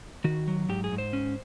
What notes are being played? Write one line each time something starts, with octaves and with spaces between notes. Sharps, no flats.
D#3 F#4
F#3
G#2 G4
G#4
G#2
C5
C#4